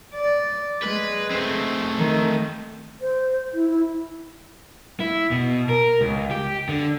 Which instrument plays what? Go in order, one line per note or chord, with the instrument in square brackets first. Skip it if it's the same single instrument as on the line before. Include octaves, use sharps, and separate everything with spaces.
[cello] D5
[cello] G#3 [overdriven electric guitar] B4
[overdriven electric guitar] A3 C4
[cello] D#3
[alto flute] C5
E4
E4
[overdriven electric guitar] E4
B2
A#4
C#2
G4
D3